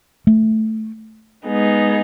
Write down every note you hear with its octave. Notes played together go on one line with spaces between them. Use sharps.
A3
G#3 B3 D#4 G#4